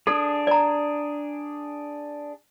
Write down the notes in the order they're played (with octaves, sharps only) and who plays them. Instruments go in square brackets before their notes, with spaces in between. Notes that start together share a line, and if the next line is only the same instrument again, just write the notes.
[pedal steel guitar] D4 G#4 [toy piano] A4
[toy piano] D5 A#5